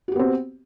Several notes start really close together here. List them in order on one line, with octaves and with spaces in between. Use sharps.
F#4 G4 B3 C4